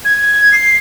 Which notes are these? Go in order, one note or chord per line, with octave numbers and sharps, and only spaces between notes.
G#6
C7